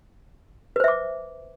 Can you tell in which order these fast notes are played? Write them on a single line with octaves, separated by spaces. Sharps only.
B4 C5 E5 D6